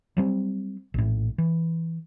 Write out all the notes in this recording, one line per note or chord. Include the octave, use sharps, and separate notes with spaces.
F#3 G3 C4
A#1 A2
E3